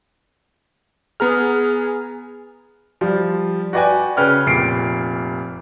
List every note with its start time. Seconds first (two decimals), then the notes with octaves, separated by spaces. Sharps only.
1.20 B3 G#4 A#5 F6
3.01 F3 G3
3.73 F#4 B4 D5 G5 G#5
4.17 C#3 C#4 B4 G5 F6
4.46 F1 A#2 C7 D7